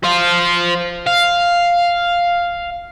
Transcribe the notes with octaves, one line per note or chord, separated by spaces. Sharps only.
C5 F5
F5